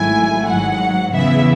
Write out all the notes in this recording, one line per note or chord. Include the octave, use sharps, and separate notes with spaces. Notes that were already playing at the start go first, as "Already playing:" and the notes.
Already playing: G#1 G#2 F#3 A3 E4 G#5
G#1 G#2 F#3 F#5
E2 C#3 E3 B3 E4 E5